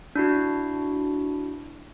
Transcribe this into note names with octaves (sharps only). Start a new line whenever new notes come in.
D4 E4 F#4